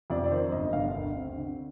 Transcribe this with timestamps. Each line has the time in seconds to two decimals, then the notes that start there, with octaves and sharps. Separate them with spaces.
0.10 F2 D5
0.24 D5
0.31 D#3 C5
0.52 G1 D#5
0.65 D#5
0.73 G1 F5
0.95 D2
1.16 C4
1.36 D3